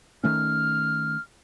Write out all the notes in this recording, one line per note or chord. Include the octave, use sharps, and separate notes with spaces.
D#3 A3 C#4 F6